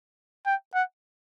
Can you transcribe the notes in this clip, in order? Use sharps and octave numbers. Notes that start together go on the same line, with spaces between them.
G5
F#5